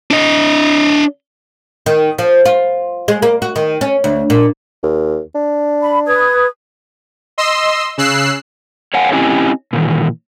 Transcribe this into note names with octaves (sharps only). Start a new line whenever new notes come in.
D4 D#5
D#3
F3
F4
G#3
A#3
F#4
D#3
C#4
D2
A#2
D#2
D4
B5
B4 D#6 G#6
D#5 C6 E6
C#3 E6 F#6 C7
C#5 F5 F#5 G#5
C4 C#4 E4 G4 D#5 G#5
A#2 D#3 E3